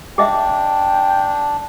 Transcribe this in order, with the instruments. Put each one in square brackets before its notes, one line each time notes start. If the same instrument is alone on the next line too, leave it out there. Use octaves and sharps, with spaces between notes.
[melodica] D4 [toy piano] G#4 D#5 E5 [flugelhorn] G5